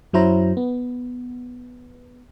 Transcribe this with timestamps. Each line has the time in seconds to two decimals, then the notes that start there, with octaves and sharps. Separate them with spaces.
0.13 F#2 F#3 E4 C5 A#5
0.57 B3